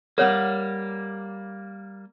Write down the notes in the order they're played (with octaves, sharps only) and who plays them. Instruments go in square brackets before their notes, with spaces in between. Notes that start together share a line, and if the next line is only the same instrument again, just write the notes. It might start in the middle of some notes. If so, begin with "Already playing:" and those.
[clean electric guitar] G3 A#3 [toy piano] A#4 C#5 F#5